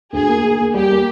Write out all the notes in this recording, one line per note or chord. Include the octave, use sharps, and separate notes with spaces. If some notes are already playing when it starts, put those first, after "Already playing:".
D2 G#4
A#3
A#3
A#3
G3 G4
A#3